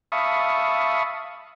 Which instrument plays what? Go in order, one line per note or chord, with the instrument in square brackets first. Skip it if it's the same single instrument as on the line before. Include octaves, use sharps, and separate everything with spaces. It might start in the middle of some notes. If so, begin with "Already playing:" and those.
[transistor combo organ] E5 F5 A5 B5 C#6 D#6